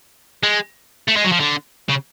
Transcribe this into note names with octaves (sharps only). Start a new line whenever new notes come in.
G#3
A3
G#3
F#3
F3
D3
C#3